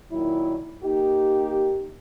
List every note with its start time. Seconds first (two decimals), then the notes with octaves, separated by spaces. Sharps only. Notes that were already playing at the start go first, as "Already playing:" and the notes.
0.12 A#2 D#3 F#3 E4
0.84 A#3 D#4 G4